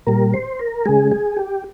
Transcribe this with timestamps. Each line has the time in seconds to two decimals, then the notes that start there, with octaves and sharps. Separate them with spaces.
0.07 A#2 G3 A#4
0.34 C5
0.59 A#4
0.86 C#3 G#3 G#4
1.12 G#4
1.37 G4